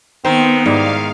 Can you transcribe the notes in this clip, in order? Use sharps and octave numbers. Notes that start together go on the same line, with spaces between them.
D#3 B3 C4 C5
G#2 G3 E4 F5